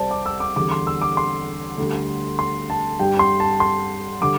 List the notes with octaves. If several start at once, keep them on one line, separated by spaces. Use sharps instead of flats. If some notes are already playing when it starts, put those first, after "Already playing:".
Already playing: C2 C3 G3 C5 D5 A5
D6
E6
D6
E2 D3 G3 D6
C6
E6
D6
C6
D2 D3 G3
C6
A5
G2 G3 G5
C6
A5
C6
D3 G3 D6